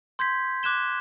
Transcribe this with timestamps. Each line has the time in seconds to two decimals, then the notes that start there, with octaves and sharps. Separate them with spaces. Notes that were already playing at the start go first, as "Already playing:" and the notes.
0.19 C6 G6 G#6 B6
0.63 D6 F#6 G#6 E7 G7